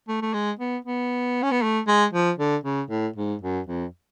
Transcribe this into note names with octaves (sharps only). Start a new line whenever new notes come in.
A3
A3
G#3
B3
B3
C#4
B3
A3
G#3
F3
D3
C#3
A2
G#2
F#2
F2